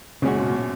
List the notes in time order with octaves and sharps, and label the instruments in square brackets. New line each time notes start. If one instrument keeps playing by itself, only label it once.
[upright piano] F#2 A#2 [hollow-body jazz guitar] C#3 G#3 C#4 F#4
[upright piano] G#2 B2
F#2 A#2